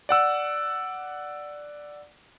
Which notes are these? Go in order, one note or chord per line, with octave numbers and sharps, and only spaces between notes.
D5 F#5 E6